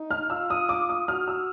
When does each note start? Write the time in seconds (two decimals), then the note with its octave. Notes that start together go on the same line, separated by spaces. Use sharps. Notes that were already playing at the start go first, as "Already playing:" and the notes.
Already playing: D#4
0.11 F6
0.30 F4 E6
0.50 D#6
0.69 D6
0.89 D#6
1.08 F#4 F6
1.28 E6